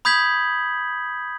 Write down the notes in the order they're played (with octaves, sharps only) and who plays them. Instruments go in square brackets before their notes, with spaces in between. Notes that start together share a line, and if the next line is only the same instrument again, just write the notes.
[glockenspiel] B5 D#6 G6 G#6 B6 F#7